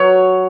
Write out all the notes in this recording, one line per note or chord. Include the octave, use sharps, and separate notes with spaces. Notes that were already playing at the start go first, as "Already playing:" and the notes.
Already playing: F#3 C#5